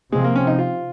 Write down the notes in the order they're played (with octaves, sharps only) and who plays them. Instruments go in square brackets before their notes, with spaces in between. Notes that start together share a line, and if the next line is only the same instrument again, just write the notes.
[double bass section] C3 F3 C4 [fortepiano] G#3
[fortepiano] A#3
C#4
D#4
F4